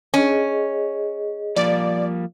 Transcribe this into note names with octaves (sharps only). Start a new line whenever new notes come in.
C#4 G#4 D#5
F3 G3 A#3 D5